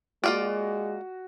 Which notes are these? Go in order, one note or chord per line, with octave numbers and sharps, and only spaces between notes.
G#3 A#3 F4 F#4 D5